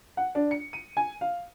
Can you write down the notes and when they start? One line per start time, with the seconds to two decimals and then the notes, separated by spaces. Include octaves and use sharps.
0.17 F#5
0.35 D4
0.51 C#7
0.73 D#7
0.97 G#5
1.21 F5